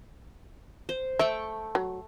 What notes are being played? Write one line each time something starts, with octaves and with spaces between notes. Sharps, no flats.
C5
A3 E5 G5 C#6
F#3